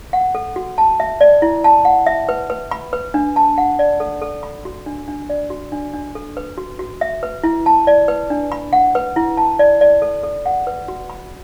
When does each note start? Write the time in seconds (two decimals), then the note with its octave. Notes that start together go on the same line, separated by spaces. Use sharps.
0.13 F#5
0.35 A4
0.56 F#4
0.78 A5
1.00 E5
1.21 D5
1.42 E4
1.64 A5
1.85 F#5
2.07 E5
2.29 B4
2.50 B4
2.71 B5
2.93 B4
3.14 D4
3.36 A5
3.58 F#5
3.79 D5
4.00 A4
4.21 A4
4.43 B5
4.65 F#4
4.86 D4
5.08 D4
5.29 D5
5.50 F#4
5.72 D4
5.94 D4
6.15 A4
6.37 B4
6.58 F#4
6.79 F#4
7.01 E5
7.23 B4
7.44 E4
7.66 A5
7.87 D5
8.08 B4
8.30 D4
8.52 B5
8.73 F#5
8.95 B4
9.16 E4
9.37 A5
9.59 D5
9.81 D5
10.02 A4
10.23 A4
10.46 F#5
10.67 B4
10.88 F#4
11.10 B5